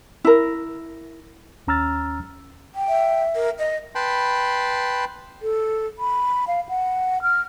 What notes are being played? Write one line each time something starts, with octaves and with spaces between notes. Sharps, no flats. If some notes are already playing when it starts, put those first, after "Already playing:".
E4 A#4
D#2 C#4 A#5 E6 F6 A6
G5
E5
A#4
D#5
B4 G5 A5 B5 C6
A4
B5
F5
F#5
F6